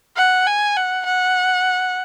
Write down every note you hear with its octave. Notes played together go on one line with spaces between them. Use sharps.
F#5
G#5
F#5
F#5